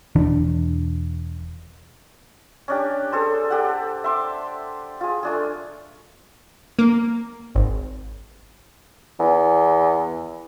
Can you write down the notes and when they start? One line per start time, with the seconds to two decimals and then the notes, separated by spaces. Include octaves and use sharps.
0.15 E1 E3 D4
2.68 C#4 D4 G4
3.12 G#4 A4 C5
3.50 G4 A4 F#5
4.04 E5 C6 D6
5.01 F4 G#4
5.23 A3 D4 G#4
6.79 A#3
7.55 G#1
9.19 E2